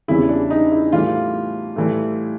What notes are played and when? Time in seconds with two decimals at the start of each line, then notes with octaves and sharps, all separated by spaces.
0.08 E2 C#3 E3 G3 E4
0.29 D4
0.50 D#4
0.72 E4
0.92 A2 E3 G3 F4
1.76 A2 E3 G3